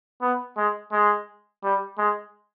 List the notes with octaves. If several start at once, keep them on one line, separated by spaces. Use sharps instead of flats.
B3
G#3
G#3
G3
G#3